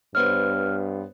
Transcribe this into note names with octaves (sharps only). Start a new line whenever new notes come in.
G2 B3 C5 C#5 F6